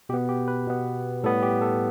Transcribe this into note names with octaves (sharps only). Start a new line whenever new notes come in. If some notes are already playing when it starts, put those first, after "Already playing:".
B2 B3 G4
G4
B4
B2 B3
A2 G3 B3 A4
G4
A4